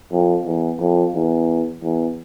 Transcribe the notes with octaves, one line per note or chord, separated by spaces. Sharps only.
F2
E2
F2
E2
E2